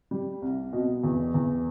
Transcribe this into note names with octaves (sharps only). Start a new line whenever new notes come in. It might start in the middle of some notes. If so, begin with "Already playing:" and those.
G3
C2
B2
E2
E2